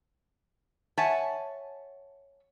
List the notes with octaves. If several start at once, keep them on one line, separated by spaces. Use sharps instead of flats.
C#5 E5 F#5 G#5 A5